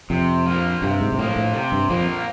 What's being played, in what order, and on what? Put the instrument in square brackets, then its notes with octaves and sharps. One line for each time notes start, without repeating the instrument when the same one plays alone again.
[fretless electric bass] F2 [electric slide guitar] C3
[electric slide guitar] F3 A#3
[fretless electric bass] G2 [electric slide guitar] C3
[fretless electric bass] G#2
G#2
[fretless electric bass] A2 [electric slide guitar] F3 A#3
[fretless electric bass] A2
[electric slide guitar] C3
[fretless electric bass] G2
[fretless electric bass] F2 [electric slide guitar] F3 A#3